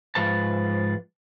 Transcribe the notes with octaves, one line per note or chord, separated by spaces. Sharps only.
G#2 F3 B4 A5